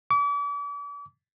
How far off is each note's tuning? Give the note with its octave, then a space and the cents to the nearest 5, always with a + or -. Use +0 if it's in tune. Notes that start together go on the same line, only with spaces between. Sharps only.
D6 -40